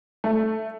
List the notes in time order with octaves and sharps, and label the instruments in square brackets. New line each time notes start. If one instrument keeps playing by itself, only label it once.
[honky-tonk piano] A3